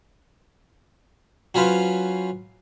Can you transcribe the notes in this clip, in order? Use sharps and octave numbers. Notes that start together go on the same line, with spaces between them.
F#3 C#4 F4 B4 C5 F5